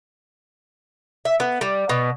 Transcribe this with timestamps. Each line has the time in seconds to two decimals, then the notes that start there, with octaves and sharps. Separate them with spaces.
1.25 E5
1.40 B3
1.61 G3
1.89 B2